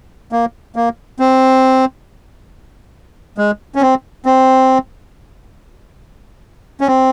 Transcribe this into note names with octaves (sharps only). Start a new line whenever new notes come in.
A#3
A#3
C4
G#3
C#4
C4
C4
C#4
C4